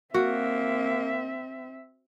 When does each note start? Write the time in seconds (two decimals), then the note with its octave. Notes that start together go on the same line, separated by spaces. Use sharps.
0.14 A#3 C4 F#4 E5